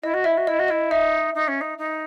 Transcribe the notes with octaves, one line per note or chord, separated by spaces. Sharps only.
E4 D#5
F#4
E4 E5
F#4
E4 D#5
F#4
E4 D#5
D#4 E5
D#4
C#4
D#4
D#4